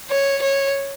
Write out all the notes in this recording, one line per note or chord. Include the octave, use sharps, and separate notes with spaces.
C#5
C#5